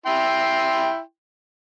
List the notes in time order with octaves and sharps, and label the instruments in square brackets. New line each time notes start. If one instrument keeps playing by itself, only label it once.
[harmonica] E4 G5 C6